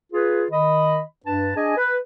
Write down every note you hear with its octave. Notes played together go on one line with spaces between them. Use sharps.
F4 G#4 B4
D#3 D#5 B5
G2 D4 B4 A5
D4 G#4 D#5 G#5
B4